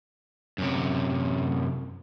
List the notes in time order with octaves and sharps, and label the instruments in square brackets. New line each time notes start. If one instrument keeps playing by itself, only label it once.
[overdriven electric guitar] F#2 C3